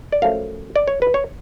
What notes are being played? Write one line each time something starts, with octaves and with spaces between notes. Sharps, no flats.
D5
F#2 F3 A3 F5
D5
C#5
B4
C#5